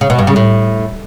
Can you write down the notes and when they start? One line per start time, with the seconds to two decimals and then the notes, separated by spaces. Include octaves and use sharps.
0.01 C#3
0.10 B2
0.19 G2
0.27 C#3
0.36 A2